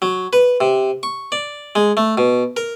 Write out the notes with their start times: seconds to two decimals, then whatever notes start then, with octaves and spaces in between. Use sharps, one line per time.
0.02 F#3
0.33 B4
0.61 C3
1.03 C#6
1.32 D5
1.75 G#3
1.97 A3
2.18 B2
2.57 A#4